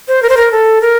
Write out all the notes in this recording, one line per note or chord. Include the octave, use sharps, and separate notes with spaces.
C5
A#4
C5
A#4
A4
A#4